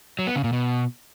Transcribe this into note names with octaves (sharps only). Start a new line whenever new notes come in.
F#3
B3
C#3
A#2
B2